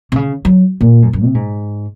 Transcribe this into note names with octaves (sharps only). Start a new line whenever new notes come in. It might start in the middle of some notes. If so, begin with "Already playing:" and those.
C3
C#3
F#3
A#2
F#2
F#2
C3
G#2